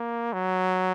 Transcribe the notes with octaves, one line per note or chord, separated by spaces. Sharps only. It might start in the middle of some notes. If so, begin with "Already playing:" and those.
Already playing: A#3
F#3